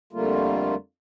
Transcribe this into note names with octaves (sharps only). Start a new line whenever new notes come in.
F2 D3 G3 A3 A#3 F4